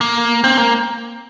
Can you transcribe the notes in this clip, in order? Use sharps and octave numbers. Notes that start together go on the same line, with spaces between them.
A#3
C4
A#3